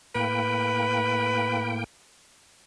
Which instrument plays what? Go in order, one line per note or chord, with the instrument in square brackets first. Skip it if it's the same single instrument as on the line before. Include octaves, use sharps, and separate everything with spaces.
[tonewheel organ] A2 A#3 G5 [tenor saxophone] B4